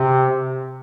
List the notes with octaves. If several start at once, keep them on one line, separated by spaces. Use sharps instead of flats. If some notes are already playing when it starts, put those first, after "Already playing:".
Already playing: C3